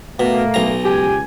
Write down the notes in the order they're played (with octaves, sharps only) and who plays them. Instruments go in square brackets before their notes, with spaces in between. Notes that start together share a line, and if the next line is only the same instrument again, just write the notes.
[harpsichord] B2 [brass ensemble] A3 A#3
[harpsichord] B1 A#5
[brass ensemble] C#2 G#5 [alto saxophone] G4